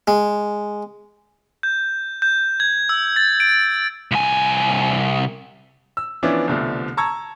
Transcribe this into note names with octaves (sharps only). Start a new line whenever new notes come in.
G#3
G6
G6
G#6
E6
A6
D7
C2 G#5
E6
E3 F3 B3 C#4 D4 E4
C2 B2 D3 F3 A3
A5 A#5 C#6 E6 G#6